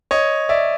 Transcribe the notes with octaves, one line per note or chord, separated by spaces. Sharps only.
C#5 D#5
D5 E5